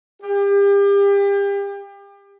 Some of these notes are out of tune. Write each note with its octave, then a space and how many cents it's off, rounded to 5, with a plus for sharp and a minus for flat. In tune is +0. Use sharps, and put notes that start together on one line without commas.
G4 +35